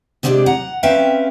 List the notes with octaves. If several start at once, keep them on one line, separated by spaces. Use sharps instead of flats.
C3 G#3 C4 D4 G4
F#5 A#5
C4 C#4 B4 E5 F5 G5